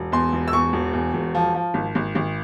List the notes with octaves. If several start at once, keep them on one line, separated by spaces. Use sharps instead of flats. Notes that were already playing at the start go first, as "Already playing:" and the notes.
Already playing: E1
E2 C6
E1
E6
E2 C#6
E1
E2
E1
F3
F3
G#1
G#1
G#1